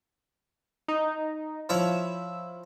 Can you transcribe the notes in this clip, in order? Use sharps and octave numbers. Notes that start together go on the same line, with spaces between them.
D#4
F3 E4 C#5 E6